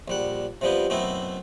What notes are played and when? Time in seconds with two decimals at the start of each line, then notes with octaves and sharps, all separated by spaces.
0.08 A#1 G3 F#5
0.61 C3 F3 G3 B3 G4
0.90 F#2 B2 A3 B3 C4 E4